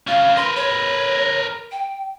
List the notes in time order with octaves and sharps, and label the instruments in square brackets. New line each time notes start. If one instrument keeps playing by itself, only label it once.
[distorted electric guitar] C#4 F4 [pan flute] F5
[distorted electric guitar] A#4 B4 [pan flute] C6
[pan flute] C#5
G5